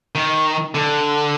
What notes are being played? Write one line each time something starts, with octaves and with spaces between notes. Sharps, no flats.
D#3
D3